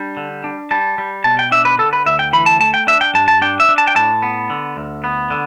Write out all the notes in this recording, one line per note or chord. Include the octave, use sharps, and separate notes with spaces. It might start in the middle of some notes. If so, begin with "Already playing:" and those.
Already playing: G3 D4
D3
D4
G3 A5
G3
B2 A5
G5
D4 E5
B4
D3 A4
B4
D2 E5
G5
E3 B5
A5
A3 A5
G5
D4 E5
G5
G2 A5
A5
D4 G5
E5
D4
A5
G5
A2 A5
B3
D3
D2
B3
D3